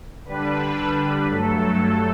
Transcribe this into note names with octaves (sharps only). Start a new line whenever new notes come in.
D3 G3 D4 B4
G2 F#3 A3 A4
A4